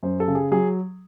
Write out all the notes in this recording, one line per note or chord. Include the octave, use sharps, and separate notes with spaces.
F#2 C5
A4
C#3
G#4
F#3 G#4